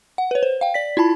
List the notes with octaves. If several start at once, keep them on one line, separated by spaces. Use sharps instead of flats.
F#5
B4 C#5
C5
F5 G5
D5 B6
E4 F4 A5 B5